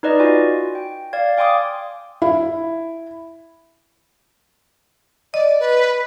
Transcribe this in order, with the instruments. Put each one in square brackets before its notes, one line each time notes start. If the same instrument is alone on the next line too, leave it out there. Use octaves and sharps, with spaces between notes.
[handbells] D#4 B4 D5 D#5
F4 F#4 G#5
G5
D5 F5 G#6
F5 G5 G#5 C6 D6 D#6
[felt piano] E4
[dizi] D5 [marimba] D#5
[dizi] B4